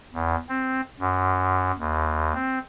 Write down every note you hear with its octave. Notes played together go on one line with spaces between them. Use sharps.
E2
C4
F#2
D#2
C4